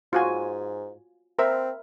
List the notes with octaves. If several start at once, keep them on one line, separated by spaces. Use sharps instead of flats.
G#2 F4 F#4 G#5
C4 A#4 C5 E5